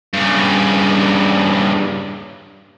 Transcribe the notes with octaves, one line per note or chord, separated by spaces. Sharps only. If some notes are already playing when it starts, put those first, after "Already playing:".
G2 C#3